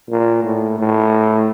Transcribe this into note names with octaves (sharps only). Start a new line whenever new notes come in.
A#2
A2
A2